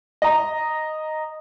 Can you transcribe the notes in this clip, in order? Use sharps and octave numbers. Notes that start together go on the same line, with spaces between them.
D#5 A#5